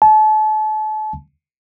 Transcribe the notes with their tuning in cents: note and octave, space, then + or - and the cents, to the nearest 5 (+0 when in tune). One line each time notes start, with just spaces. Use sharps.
A5 -35